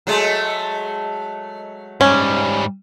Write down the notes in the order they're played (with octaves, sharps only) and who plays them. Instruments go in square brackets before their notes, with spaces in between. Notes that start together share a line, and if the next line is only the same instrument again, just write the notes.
[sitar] F#3 G#3 A3
[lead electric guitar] G#2 G3 [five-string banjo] C#4